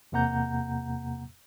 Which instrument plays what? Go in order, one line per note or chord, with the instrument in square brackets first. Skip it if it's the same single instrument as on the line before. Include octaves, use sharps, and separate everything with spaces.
[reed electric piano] E2 C3 A#3 F#5 A#5 G6